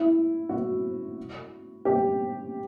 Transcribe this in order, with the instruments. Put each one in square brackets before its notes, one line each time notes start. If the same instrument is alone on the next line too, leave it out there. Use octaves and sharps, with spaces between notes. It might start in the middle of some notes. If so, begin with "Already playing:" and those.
Already playing: [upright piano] E4
F#4
G4